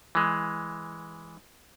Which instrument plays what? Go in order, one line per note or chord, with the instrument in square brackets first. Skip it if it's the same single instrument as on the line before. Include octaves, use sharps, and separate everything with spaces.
[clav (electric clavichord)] E3 G#3